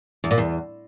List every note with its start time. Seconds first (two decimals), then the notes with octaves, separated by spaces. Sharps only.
0.24 E2
0.31 A#2
0.38 E2